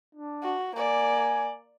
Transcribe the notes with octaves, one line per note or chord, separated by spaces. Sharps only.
D4
F#4
A#3 D5 G#5